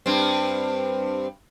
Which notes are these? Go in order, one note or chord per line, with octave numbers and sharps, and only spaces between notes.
G2 C4